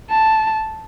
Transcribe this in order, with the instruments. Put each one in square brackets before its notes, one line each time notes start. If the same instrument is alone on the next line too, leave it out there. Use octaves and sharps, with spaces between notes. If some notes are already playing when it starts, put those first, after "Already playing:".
[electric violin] A5